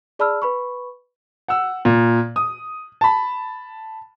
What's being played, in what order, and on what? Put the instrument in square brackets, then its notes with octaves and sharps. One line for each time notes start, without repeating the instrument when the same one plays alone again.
[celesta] G#4 D5 A5 B5 E6 F6
B4 B5 C#6
[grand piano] F#5 E6
A#2
D#6
A5 B5